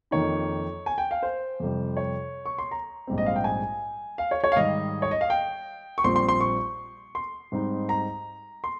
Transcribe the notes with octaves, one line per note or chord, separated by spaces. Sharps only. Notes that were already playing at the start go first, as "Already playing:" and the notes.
F2 D#3 A#3 D#4 C#5
G#5
G5
F5
C5
F2 C3 G3
C#5
C#6
C6
A#5
A#1 G#2 G3 C4
D#5
F5
G5
G#5
F5
C#5
C#5
F5
G#2 D#3 G3 D#5
C#5
D#5
F5
G5
C#6
A#1 A#2 G3 C4 C6
C6
C6
C#6
C6
G#2 G3 C4 D#4
A#5
C6